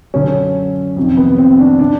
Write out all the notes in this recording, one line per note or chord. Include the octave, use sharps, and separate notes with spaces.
F#2 D3 C#4
F2 C3 D#3
B3
C4
D4
D#3 D4